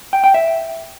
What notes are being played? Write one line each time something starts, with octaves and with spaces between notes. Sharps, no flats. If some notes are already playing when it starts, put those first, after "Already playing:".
G5
G5
E5